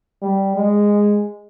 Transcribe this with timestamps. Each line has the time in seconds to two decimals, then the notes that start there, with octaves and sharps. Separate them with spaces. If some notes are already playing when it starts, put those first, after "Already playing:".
0.22 G3
0.56 G#3